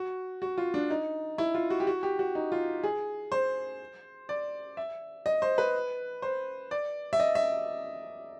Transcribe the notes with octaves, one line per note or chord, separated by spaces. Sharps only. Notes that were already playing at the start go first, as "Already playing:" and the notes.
Already playing: F#4
F#4
F4
D4
D#4
E4
F4
F#4
G4
F#4
G4
F#4
D#4
F4
G#4
C5
D5
E5
D#5
C5
B4
C5
D5
E5
D#5
E5